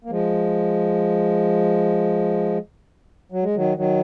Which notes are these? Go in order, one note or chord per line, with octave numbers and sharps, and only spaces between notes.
A#3
F3 G#3
F#3
G#3
D#3 F#3
D#3 F#3